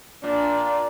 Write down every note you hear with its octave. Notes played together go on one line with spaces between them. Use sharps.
A#2 D4